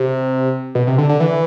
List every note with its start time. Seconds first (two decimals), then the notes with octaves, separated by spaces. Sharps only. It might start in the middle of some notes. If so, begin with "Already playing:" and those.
Already playing: C3
0.75 B2
0.87 C3
0.98 D3
1.09 D3
1.20 E3